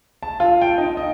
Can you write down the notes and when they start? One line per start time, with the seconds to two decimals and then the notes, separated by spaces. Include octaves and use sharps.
0.23 A5
0.40 F4
0.61 G5
0.78 D#4
0.97 D#5